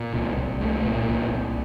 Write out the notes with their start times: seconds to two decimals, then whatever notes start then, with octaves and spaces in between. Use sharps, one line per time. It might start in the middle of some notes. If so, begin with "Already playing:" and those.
Already playing: A#2
0.13 C2
0.37 C2
0.61 A3
0.85 A#2
1.09 C2
1.31 C2